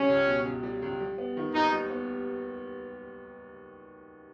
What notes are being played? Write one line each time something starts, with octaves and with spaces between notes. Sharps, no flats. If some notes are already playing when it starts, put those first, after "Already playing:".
Already playing: C#3 G3 C#4
C#2
B2
C#2
G3
C#2
G3
B3
D#3
D#2 D#4
G3
B3